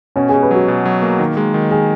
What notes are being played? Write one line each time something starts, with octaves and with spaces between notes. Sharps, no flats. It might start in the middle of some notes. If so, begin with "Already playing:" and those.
B2 C#4
B2 G#4
B4
F#3 F#4
B2
F#3
A#3
D#3
G#3
D#3
D#3 G#4